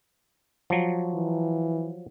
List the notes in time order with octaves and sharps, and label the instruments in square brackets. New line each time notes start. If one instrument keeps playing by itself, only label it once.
[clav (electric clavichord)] F3 F#3
[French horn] E3